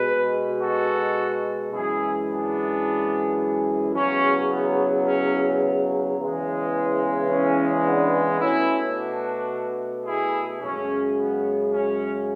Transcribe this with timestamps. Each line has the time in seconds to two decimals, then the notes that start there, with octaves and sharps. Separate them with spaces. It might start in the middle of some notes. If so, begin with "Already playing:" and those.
Already playing: B2 G#3 G#4 B4
0.62 F#4 A4
1.73 F#2 E3 G#3 E4 G#4
2.28 B3 D4
3.95 E2 C#3 F#3 C#4
4.51 B3
5.06 C#4
6.17 E2 C#3 E3 G#3
7.28 C#4
7.84 B3 D4
8.39 B2 A3 C#4 E4
8.95 D4 F#4
10.06 E4 G#4
10.62 F#2 C#3 G#3 C#4
11.17 B3
11.73 C#4